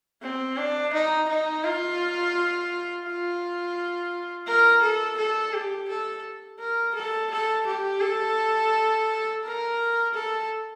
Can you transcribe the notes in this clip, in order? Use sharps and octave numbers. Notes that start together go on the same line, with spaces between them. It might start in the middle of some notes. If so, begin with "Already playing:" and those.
C4
D4
D#4
D#4
F4
F4
A#4
A4
A4
G4
A4
A#4
A4
A4
G4
A4
A#4
A4